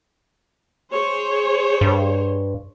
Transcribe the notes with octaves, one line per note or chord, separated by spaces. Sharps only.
G#4 C5 C#5
G2